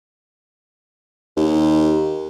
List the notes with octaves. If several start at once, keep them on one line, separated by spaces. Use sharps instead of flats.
D#2